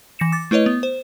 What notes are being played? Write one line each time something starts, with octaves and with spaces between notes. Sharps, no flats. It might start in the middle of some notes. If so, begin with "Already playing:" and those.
E3 A#6 C#7 E7
D6 A6
A3 E4 B4 C#5 D#5
B3
C5